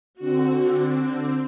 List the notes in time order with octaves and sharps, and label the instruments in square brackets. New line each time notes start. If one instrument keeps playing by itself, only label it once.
[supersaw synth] D3 [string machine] C4 [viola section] F#4